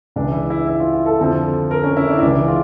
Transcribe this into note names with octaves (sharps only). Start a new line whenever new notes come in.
C#2 C#3 E3 D4
E4
E4
E4
F4
F4
A4
F2 D3 F3
A#4
C#4
E4
D4
E4
C#2 C#3 E3 D4
F4